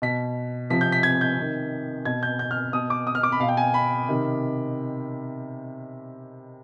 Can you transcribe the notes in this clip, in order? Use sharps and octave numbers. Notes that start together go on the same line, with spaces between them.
B2 B6
C3 F3 B6
G6
B6
G#6
G6
C3 D#3
B2 G#6
G6
G6
F6
B2 D#6
D6
D#6
F6
D6
B5
B2 F5
G5
G#5
B5
C3 D#3